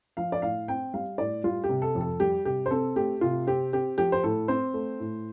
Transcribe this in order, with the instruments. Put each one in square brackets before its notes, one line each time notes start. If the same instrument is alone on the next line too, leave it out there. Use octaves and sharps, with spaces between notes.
[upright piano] F3 F5
D5
A2 F5
C4 G5
G3 F5
A2 D5
G3 F4
G4
C3
A4
F2
A4
G3 G4
C3 G4
C5
C4 A4
A3 G4
C3 F4
C4 G4
C4 G4
F3 G4
C5
A2 A4
C4 C5
A3
A2